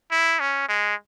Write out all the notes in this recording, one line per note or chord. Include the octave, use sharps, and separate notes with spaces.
E4
C#4
G#3